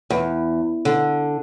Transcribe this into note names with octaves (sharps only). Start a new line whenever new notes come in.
E2
D3